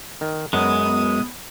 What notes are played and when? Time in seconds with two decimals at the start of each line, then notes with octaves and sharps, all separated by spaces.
0.21 D#3
0.53 F#2 F#3 G#3 B3 D#6